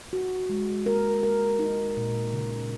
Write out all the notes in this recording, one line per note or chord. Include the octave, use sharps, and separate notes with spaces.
F#4
G#3
A#4
A#4
D#4
A#2
C#3